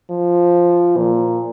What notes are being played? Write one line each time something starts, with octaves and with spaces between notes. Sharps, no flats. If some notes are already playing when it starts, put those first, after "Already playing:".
F3
A#2